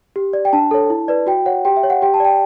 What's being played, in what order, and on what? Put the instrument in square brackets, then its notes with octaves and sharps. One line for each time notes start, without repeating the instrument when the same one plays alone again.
[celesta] G4
D5
G5
D4 A5
A4 C#5
E4
B4 D5
F#4 G5
C#5 F#5
G4 G5
E5
C#5
F#5
G4 G5
A5
D5 G5